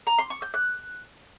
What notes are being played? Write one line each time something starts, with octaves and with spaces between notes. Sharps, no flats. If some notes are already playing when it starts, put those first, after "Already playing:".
A#5
C6
C#6
G6
F#6